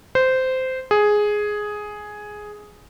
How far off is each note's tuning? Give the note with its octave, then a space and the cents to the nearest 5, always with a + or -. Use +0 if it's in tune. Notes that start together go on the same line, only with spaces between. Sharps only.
C5 -15
G#4 +5